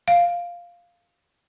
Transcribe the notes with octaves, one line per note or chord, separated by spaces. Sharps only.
F5